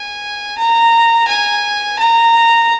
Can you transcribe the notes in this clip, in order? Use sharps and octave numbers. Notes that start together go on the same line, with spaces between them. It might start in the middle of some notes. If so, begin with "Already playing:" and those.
Already playing: G#5
A#5
G#5
A#5